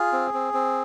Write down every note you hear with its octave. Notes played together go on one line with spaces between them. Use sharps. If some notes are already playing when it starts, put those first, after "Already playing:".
Already playing: F4 G#4
C4
C4
C4